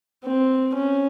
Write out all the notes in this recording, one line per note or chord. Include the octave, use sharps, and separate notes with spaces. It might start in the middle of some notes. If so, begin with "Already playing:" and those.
C4
C#4